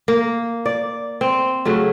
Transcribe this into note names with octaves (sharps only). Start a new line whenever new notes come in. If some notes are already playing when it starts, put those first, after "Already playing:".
A#3
D5
C4
C#3 F#3 A3